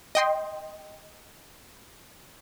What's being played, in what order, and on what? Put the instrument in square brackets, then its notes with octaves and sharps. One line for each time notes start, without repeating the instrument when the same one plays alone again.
[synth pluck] D#5 G5 C6